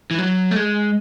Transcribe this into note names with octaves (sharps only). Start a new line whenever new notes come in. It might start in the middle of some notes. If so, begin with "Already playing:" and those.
E3
F#3
A3
G#3